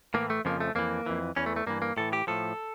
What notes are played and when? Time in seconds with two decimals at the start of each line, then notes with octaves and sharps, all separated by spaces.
0.14 A2 E3 A#3
0.30 A3
0.45 F2 C#3 F3 A#3
0.61 A3
0.75 F2 E3 A#3
1.06 F2 E3
1.36 E2 E3 C#4
1.46 A3
1.56 A3
1.67 G2 E3 A#3
1.82 A#3
1.97 A2 E3 A4
2.13 G4
2.27 A2 F3 A4